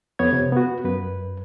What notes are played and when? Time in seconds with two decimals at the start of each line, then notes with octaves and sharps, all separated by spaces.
0.19 F2 B3 C#5 G#6
0.33 C3
0.52 B3 F#4
0.84 F#2 B4